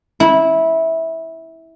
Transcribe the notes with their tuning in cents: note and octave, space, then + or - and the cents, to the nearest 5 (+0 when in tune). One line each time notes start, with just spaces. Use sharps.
E4 -15